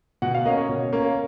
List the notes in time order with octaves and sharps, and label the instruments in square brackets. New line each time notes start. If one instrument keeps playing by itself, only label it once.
[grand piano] B2 F#5
F5
A#3 C#4 D#5
C#5
B2
A#3 C#4